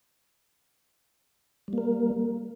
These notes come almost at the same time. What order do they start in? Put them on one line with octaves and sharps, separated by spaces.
G3 A#3 A#4